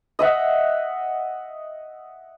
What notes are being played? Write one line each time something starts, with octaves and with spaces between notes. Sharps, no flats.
D#5 E5 F#5